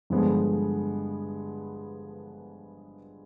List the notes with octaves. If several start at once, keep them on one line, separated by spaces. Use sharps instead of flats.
G2 D3 F3 G#3 B3